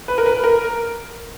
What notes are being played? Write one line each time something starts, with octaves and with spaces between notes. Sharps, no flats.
B4
A#4
B4
A#4